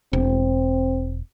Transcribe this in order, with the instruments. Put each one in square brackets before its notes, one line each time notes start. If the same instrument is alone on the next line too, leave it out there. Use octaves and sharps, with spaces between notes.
[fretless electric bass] E1 [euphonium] C4